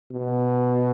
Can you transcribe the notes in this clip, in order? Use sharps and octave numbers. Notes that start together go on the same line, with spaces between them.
B2